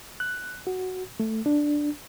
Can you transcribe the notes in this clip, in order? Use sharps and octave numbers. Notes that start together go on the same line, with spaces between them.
F#6
F#4
A3
D4